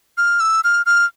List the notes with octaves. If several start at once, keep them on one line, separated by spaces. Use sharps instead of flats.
F6
E6
F6
F6